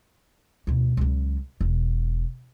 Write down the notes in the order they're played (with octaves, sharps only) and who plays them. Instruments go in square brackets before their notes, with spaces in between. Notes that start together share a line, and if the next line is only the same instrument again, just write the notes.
[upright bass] D2 B2
C#2 F#3
E1